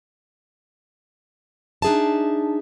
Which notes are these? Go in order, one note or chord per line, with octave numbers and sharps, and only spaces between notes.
D4 D#4 G#4 E5 A5